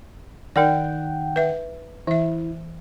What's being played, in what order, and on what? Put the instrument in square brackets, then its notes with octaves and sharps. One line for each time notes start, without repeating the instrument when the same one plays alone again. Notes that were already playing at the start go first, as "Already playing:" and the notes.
[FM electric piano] D#3 F#5 G5 [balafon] D#4 A#4 D5
[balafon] B4 E5
[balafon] E3 E5 [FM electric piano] E4